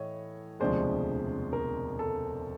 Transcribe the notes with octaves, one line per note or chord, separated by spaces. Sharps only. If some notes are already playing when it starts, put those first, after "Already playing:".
Already playing: A2 E3 C#5 D#5
E1 D2 C3 F3 G#3 C5 D5
A#4
A4